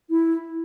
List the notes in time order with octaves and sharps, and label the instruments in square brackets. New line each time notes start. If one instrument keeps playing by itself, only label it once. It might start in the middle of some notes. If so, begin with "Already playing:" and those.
[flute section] E4